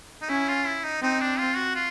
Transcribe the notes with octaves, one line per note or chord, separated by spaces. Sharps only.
D#4
C#4 E4
F4
E4
D#4
C4 D#4
D4
F4
F#4
F4